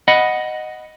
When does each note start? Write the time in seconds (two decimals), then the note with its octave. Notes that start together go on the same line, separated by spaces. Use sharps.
0.08 D#5 F#5 B5